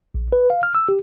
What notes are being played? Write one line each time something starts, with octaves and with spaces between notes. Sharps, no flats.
A#1
B4
F5
F6
E6
G4